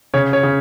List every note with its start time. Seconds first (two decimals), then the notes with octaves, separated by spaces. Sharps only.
0.14 C#3 C#5
0.33 C#5
0.43 C#3